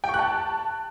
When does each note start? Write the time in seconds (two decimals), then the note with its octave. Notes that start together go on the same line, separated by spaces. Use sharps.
0.04 G5
0.09 C#6
0.14 F#6
0.19 A5